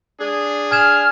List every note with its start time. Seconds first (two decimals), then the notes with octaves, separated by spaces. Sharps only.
0.21 D4 G#4
0.71 G#5 F6 G#6 E7